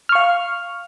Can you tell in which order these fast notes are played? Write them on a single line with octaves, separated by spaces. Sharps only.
F6 C#6 F5